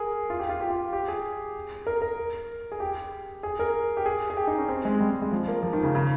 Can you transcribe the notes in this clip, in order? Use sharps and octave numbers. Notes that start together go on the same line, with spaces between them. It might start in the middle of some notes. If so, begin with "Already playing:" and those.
Already playing: G#4 A#4
F4
G4
F4
G4
F4
G4
G#4
A#4
A#4
G#4
G4
G#4
A#4
G4
G#4
G#4
G4
D#4
C#4
C4
G#3
G3
G#3
G#3
F3
A#3
F3
D#3
C#3
C#3